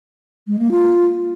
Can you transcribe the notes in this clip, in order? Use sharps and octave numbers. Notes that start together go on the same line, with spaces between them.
G#3
A#3
F4